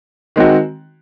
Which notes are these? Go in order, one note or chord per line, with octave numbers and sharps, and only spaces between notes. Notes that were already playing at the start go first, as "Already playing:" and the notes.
D#3 G#3 C4 F#4